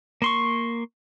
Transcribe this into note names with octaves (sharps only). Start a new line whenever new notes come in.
A#3 C6 C#6